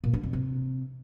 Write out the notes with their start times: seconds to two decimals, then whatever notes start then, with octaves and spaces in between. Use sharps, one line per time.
0.04 A#2
0.13 D3
0.23 F2
0.33 C3